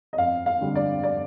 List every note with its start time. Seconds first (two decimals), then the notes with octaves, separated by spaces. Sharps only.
0.13 D#5
0.18 F2 F5
0.46 F5
0.61 D3 G3
0.75 D5
1.03 D5